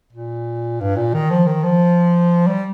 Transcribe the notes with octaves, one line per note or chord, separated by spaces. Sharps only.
A#2
G2
A#2
D#3
F3
D#3
F3
G3